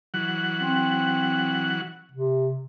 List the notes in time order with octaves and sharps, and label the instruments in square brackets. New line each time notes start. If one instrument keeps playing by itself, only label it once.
[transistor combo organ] E3 F#3 F#5
[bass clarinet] C4
C3